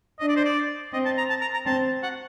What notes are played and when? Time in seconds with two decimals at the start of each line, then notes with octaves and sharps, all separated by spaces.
0.19 D4 D#5
0.28 D5
0.36 C5
0.45 D5
0.93 C4 D#5
1.05 A5
1.18 A#5
1.29 A5
1.41 A#5
1.54 A#5
1.66 C4 A5
2.03 F#5